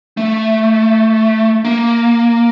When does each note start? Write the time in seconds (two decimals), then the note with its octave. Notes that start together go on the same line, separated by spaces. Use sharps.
0.17 A3
1.65 A#3